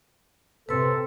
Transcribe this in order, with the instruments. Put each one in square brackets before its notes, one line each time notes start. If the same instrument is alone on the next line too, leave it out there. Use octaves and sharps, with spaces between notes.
[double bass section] C3 [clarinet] A4 [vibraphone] B4 C6